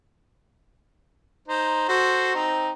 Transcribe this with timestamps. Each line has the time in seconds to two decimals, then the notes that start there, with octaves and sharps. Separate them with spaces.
1.48 D#4 C5
1.89 F#4 A4 C5
2.35 C4 D#4